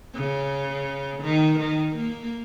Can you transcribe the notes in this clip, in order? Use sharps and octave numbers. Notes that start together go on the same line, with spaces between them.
C#3
D#3
D#3
A#3